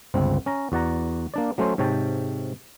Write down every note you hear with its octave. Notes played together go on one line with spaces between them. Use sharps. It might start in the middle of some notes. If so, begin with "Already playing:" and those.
G1 C#2 C4
C#4 A#5
E2 F#4 D5 F#5 A#5
A#3 D4 D5
F#3 A3 C#4 C5
G#2 C3 C#5 G5 A5